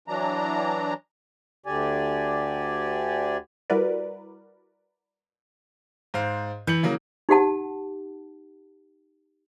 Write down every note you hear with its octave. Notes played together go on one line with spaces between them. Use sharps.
E3 F#3 D4 A#5
D2 D3 G4 D5 G#5
G3 E4 F#4 A#4 B4 D5
G#2 C5 F5
E3 G6 C#7 F#7
C#3 F#3 A#3
D#4 G4 F#5 A5